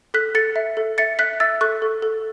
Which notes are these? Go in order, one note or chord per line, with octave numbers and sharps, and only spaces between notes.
A4 F#6 B6
A4 A6 C#7
E5
A4
E5 A6 C#7
E5 F#6 B6
E5 E6 A6
A4 C#6 F#6
A4
A4